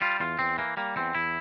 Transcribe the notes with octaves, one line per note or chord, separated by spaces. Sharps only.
G3 F4
E2 F4
E2 C4
E3 A#3
G3 A#3
E2 C4
E2 E4